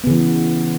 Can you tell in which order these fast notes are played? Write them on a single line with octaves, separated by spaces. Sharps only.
B3 C#3 E3